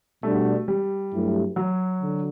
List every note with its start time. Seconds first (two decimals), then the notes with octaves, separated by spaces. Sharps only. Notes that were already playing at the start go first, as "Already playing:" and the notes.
0.23 B2 G3 A3 D4 F#4
0.68 G3
1.13 G2 F#3 A3 E4 G4
1.56 F#3
2.01 D3